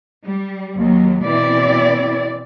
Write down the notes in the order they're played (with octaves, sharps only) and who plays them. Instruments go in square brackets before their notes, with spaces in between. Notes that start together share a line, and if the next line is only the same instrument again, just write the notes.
[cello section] G3
D#2 F#3
B2 E3 C4 E4 D5